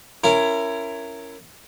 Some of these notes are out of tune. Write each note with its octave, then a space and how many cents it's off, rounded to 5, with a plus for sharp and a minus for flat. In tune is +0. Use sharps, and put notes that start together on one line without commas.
C#4 +0 E4 +20 A#4 -10